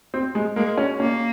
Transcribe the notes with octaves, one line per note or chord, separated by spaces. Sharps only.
C4
G#3
G#3 A#3
C#4
A#3 C#4